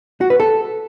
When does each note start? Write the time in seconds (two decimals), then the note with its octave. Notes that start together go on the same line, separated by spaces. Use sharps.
0.21 F#4
0.30 B4
0.40 A4